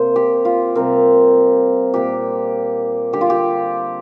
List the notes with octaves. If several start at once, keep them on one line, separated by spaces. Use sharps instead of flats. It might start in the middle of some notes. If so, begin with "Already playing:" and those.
Already playing: C3 A#3 C5
G4
F4
C3 G3 C4 A#4
A#2 A#3 G4
D3 G3 C4 G4
F4
G4